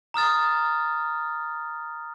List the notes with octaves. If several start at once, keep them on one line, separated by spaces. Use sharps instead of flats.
A#5 D#6 F6 A6